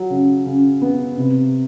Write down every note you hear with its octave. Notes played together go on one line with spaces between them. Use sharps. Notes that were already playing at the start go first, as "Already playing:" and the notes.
Already playing: F#3
C#3
C#3
B3
C3